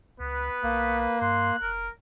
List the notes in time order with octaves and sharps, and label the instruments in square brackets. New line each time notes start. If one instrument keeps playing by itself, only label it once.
[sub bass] C#2 [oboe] B3 [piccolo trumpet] B4
[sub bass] B1 [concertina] A#3
[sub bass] G2 [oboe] C6 [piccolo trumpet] F#6
[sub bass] F1 [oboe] A#4